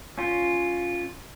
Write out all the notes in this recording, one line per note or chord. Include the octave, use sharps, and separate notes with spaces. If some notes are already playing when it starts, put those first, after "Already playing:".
C#4 F4